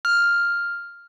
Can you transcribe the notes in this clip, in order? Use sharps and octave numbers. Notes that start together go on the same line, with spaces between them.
F6